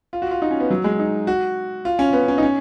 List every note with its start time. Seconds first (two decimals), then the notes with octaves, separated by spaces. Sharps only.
0.13 F4
0.22 F#4
0.31 F4
0.42 D#4
0.51 C#4
0.60 B3
0.70 F#3
0.84 G#3
0.99 D#4
1.27 F#4
1.85 F4
1.99 C#4
2.13 B3
2.28 C#4
2.38 D#4
2.43 C#4